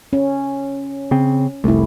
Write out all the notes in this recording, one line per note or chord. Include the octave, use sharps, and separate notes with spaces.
C#4
C#3 C4
F1 C2 A3 E4